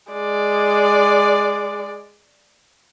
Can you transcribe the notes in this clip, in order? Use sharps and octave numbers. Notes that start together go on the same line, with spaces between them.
G#3 D5